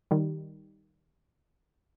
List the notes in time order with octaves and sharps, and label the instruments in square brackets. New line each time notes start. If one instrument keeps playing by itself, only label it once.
[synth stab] D#3 G3